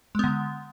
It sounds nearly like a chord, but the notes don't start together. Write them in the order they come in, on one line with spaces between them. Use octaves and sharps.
G#3 B3 D3